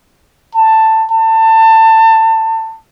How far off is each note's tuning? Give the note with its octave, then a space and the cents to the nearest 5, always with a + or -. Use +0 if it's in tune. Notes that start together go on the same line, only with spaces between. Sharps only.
A5 +10
A5 +25